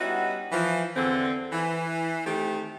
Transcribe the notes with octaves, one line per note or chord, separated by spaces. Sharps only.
G3 B3 C#4 D#4 E4 F#4
E3 F3
E2 D3 C4
E3
D#3 A3 C4 G4